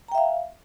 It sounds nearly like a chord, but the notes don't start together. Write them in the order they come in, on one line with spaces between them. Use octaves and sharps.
A#5 G5 E5 F5